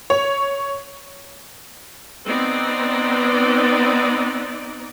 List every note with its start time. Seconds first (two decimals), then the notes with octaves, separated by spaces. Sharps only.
0.10 C#5
2.25 B3 C4 D#4 D5